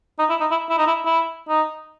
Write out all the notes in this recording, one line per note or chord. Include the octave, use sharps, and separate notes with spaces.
D#4
E4
D#4
E4
E4
D#4
E4
E4
D#4